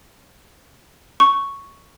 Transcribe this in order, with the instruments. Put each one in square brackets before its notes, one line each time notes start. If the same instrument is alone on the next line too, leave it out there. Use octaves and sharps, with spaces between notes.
[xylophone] C#6